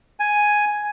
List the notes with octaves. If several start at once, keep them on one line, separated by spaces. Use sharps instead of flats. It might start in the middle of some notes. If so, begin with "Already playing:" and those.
G#5